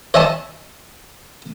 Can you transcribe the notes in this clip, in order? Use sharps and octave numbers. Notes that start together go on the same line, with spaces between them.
C#5 D#5 E5 G#5 A5 C#6